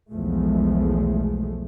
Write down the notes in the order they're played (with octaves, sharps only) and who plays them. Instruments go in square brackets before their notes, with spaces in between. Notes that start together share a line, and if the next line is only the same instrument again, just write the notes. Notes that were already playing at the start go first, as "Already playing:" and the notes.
[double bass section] B1 E2 F3 G#3 A3